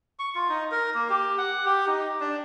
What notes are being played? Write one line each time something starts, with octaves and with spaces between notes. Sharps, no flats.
C#6
F4
D#4
A#4
A#3
G4
F#5
G4
D#4
D4